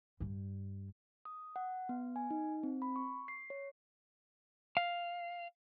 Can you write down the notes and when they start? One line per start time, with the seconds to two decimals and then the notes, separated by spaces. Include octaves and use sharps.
0.20 G2 G3
1.25 D#6
1.56 F#5
1.89 B3
2.16 G#5
2.30 D#4
2.63 C4
2.82 B5
2.96 C#6
3.28 C7
3.50 C#5
4.77 F5